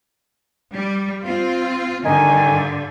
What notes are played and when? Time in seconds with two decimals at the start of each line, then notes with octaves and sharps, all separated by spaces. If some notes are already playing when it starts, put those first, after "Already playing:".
0.73 G3
1.23 C4 F4
2.05 G2 D3 D#3 D4 G#5